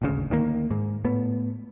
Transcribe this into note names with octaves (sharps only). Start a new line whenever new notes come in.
D#1 G#1 D2 C#3
D2 D#3 E3 A#3
G#2
A2 B3